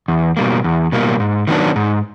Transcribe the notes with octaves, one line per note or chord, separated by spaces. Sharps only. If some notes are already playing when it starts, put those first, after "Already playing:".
E2
B2 G3 A#3
E2
B2 G3 A#3
G#2
D#3 F#3 B3 D4
G#2